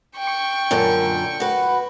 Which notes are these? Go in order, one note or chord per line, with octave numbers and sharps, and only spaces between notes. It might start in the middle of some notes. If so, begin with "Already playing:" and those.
G5 C#6
F#2 A#2 D3
F#4 B4